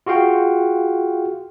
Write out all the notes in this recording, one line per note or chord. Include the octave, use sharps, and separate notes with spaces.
F4 F#4 G#4 F5 G5